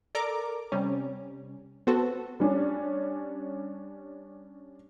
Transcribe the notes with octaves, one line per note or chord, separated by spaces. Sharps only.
A4 A#4 D5 A#5 D6
C3 G3 C#4
B3 C4 F#4 A4
G3 C#4 D4